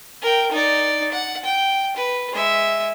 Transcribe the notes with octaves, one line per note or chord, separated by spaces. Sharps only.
A#4 G5
D#4 D5
F#5
G5
B4
G#3 E5